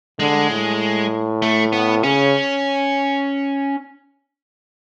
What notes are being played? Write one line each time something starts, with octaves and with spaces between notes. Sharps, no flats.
D3 G#3
A2
A3
B3
C#3 C#4